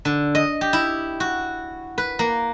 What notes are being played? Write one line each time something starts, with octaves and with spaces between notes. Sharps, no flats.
D3
D#5
G4
E4
F#4
B4
A#3